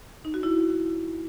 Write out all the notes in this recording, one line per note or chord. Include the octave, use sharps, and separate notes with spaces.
D#4
F#4
E4